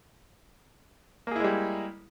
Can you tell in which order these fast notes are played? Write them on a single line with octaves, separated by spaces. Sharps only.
A#3 G#4 E4 G#3 G3